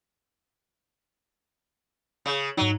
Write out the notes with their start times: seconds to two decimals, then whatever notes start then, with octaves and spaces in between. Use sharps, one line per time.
2.26 C#3
2.57 G#2 F#3 D#4